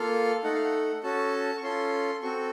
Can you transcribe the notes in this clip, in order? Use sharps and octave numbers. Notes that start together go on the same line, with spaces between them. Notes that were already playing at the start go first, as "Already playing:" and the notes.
Already playing: A#3 F4 A4 F5
A3 D#4 A4 F#5
F5
F#5
C#4 F#4 A4 A5
C#6
C#4 F4 A4 C6
C4 F#4 A4 C#6